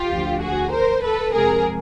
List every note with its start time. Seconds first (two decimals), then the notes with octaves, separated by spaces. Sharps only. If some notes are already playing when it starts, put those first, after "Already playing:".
Already playing: F4 G4
0.11 D2 D3 F3
0.42 F#4 G#4
0.72 A#4 C5
1.03 A4 B4
1.34 F2 C3 F3 G#3 G#4 A#4